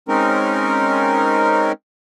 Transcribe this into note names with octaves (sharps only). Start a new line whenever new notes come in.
G#3 C4 C#4 D#4 A#4